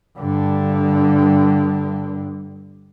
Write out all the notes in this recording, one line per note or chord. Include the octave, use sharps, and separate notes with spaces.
G2 D3